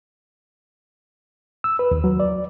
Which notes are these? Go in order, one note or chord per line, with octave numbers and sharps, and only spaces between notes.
E6
B4
D#2
F#3
D5